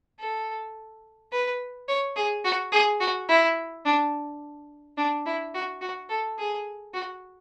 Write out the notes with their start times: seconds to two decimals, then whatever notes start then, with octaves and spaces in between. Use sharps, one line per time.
0.19 A4
1.32 B4
1.88 C#5
2.16 G#4
2.44 F#4
2.72 G#4
3.00 F#4
3.29 E4
3.85 D4
4.97 D4
5.26 E4
5.54 F#4
5.81 F#4
6.10 A4
6.38 G#4
6.94 F#4